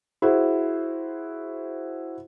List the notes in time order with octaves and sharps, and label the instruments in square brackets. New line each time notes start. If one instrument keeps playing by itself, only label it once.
[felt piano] E4 F#4 G#4 C5